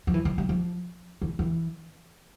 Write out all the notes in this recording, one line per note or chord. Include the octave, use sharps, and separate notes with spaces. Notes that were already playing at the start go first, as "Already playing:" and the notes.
F3
E3
F3
G3
F3
E3
E3